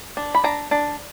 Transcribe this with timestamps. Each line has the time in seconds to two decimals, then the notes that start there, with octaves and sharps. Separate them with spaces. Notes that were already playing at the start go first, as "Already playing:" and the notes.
0.17 D4
0.35 B5
0.44 D4 A#5
0.71 D4